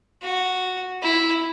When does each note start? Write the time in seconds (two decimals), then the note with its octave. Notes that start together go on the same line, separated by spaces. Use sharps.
0.22 F#4
1.02 E4